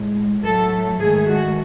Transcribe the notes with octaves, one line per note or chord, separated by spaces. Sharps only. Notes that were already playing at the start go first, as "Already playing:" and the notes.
Already playing: A2 G#3
A2 F#3 A3 A4
G#2 D#3 A3 G#4
F#4